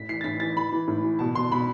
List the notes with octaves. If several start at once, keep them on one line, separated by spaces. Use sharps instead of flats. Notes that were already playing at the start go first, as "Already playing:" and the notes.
Already playing: A2 B6
E3 C7
A6
A2 B6
E3 A6
E3 B5
E3
A2
E3
B2 A5
B2 C6
B2 B5